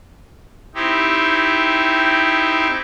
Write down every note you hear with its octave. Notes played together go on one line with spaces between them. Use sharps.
C4 D#4 E4 G4